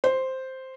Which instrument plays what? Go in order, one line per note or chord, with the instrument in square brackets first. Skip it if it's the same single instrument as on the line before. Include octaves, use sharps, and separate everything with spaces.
[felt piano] C5